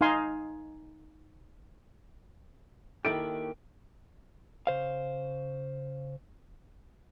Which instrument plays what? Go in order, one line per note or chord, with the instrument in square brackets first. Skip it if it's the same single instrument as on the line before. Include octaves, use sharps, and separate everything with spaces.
[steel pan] D#4 F5 G#5 C6
[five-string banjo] D#3 E4 A4 [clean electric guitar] A#3 G4 [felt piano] D7
[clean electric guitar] C#3 C5 F5